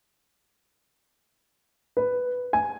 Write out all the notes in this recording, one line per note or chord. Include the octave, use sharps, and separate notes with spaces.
B4
G#5